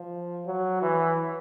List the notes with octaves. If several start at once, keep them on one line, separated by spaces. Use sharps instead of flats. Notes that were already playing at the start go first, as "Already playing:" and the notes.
Already playing: F3
F#3
E3